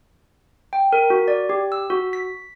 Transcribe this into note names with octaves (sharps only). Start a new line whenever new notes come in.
G5
A#4
F#4
D5
G4
E6
F#4
B6